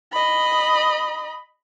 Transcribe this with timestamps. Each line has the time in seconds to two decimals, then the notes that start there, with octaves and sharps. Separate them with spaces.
0.13 D#5 B5